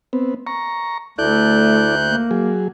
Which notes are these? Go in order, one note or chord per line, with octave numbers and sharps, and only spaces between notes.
B3 C4
A#5 C#6
D2 A3 E4 A4 D5 F#6 G6
A#3
F#3 G#4